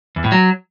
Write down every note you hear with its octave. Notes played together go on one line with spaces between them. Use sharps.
E2
A2
F#3